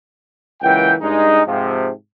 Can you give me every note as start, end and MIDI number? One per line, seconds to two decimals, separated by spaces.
0.62 0.93 37
0.62 0.93 52
0.62 0.93 58
0.62 0.93 78
0.62 0.93 79
1.01 1.42 43
1.01 1.42 56
1.01 1.42 63
1.47 1.89 44
1.47 1.89 48
1.47 1.89 53